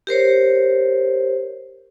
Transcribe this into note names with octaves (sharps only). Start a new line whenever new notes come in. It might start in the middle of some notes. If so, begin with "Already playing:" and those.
G4 A#4 C5 C#5